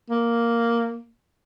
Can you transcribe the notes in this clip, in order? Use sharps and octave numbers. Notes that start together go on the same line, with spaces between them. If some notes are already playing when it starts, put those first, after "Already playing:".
A#3